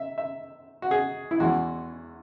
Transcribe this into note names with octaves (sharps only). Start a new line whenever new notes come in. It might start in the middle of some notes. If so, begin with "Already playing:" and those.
Already playing: E5
E5
F#4
G#4
E4
E2 E3 G#3 F#4